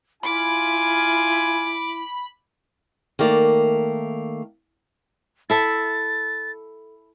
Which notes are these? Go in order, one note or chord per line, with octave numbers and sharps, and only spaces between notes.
E4 F4 G#5 B5 D6
D#3 A3 A#3 D5
E4 A4 E5 A6